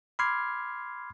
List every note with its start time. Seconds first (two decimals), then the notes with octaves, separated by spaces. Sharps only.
0.19 B5 C6 D6 F6 G#6 C7